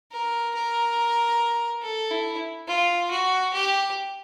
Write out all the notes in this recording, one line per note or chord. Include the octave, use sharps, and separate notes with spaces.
A#4
A#4
A4
E4
F4
F#4
G4